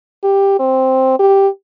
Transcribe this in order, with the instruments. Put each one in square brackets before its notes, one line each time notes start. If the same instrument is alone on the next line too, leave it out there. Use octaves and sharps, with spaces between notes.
[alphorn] G4
C4
G4